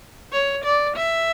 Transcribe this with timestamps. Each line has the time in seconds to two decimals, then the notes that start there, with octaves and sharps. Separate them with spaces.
0.32 C#5
0.65 D5
0.96 E5